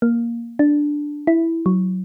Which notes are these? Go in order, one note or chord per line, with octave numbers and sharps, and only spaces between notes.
A#3
D4
E4
F#3